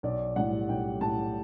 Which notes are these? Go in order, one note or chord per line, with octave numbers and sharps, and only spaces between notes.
B1 D5
A2 G3 F#5
B1 G5
A2 G3 A5